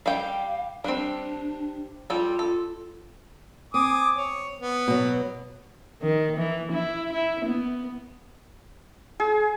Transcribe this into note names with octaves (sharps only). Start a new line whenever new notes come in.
G3 F5 G5
G3 C4 D4
G3 F4 A4
A4
C4 G#5 D6 D#6
C#5
B3
B2 F#3
D#3
E3
E4
E4
B3
G#4